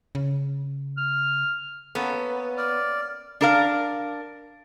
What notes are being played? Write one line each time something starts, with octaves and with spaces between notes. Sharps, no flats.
C#3
F6
A#3 B3 C#4 A4
D5 F6
D4 A#4 F5